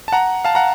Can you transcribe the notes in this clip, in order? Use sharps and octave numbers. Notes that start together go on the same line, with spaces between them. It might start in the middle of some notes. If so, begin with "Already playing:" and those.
A5
F#5 A#5
F5 A5
F#5 A#5